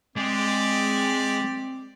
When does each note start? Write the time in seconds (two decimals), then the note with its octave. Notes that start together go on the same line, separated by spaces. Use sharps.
0.16 G#3 C4 G4 D5